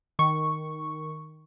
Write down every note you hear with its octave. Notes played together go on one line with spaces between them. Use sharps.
D#3 C#6